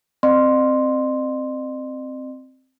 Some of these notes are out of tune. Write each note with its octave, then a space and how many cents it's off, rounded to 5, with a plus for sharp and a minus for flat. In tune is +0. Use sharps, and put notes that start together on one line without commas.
C4 +0 D#5 -45 C6 +0